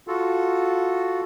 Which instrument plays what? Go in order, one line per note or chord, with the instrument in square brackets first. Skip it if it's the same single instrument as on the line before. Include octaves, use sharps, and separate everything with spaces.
[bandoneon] F4 F#4 A4